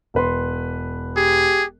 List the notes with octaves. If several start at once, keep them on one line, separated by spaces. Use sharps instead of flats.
E1 B4 C6
G4 G#4